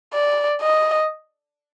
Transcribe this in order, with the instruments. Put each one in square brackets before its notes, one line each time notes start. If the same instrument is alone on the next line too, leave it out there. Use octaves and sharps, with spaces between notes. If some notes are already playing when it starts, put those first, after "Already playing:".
[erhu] D5
D#5